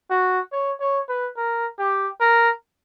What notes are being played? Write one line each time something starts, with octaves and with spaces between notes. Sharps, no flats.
F#4
C#5
C#5
B4
A#4
G4
A#4